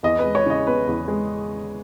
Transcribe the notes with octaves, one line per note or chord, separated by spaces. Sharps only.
E2 D#5
B4
G#3
C#5
C#3 D#5
B3 B4
E2
G#3